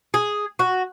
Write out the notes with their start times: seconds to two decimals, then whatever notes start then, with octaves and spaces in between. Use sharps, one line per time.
0.14 G#4
0.59 F#4